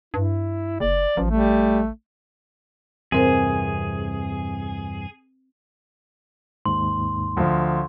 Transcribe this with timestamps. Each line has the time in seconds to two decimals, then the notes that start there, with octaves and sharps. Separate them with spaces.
0.14 G2 E4
0.80 F#1 D5
1.17 A1 F3
1.31 G3 A3
3.12 E2 G2 C3 C4 G#4 A#4 C5
6.66 D#2 G#2 C6
7.37 D2 F3